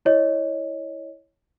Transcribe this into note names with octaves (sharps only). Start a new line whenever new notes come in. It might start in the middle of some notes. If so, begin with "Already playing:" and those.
E4 C#5 D#5